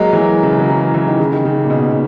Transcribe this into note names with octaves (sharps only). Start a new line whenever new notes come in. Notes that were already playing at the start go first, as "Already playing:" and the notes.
Already playing: F#3 G#3 A#3
E3
F#3
C#3
F#3
E3
E3
D#3
C#3
D#3
C#3
A#2
B2
B2